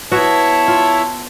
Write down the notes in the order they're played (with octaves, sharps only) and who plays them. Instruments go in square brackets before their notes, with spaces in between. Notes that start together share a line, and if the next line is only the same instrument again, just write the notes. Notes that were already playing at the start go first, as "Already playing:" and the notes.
[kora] B3 F#4 [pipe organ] E4 C#5 E5 [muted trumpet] A5
[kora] F4